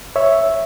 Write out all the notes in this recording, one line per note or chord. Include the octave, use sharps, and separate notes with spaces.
C#5 E5